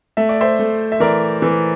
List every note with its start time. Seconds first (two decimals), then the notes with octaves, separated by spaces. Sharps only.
0.17 A3 E5
0.29 D5
0.41 C5 E5
0.59 A3
0.92 E5
1.00 E3 A#4 D5
1.42 E3